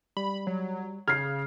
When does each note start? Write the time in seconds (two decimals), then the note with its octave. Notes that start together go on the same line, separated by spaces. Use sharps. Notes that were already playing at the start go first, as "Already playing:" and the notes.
0.17 G3 B5
0.47 F#3
1.08 C#3 F6 G#6 C7